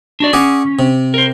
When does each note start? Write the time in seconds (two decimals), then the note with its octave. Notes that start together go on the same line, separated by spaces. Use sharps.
0.20 D4 F#4 D5
0.33 C#4 G#4 D5 F#5
0.79 C3
1.14 A#4 C5